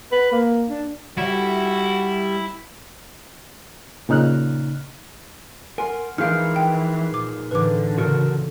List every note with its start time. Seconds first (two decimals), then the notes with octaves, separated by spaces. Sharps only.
0.12 B4
0.32 A#3
0.68 D4
1.18 G3 E4 F#4
4.09 A#2 C#3 D#4 F6 F#6
5.78 A#4 F#5 G#5 C6 C7
6.18 E3 F3 D#4 G#4 A#4 B4 F5 F6
6.56 G5
7.14 A#2 D6
7.51 A2 D3 E3 C4 B4 D6
7.98 A#2 C#3 F#4 A4 A#4